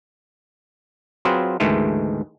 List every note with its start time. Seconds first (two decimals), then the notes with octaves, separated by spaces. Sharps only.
1.25 F#3 C4 F4 G#4 B4
1.60 D2 G#2 D#3 E3 G#3 A3